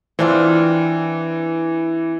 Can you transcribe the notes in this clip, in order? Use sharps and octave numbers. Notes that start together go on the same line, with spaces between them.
E3 C4 D4 F4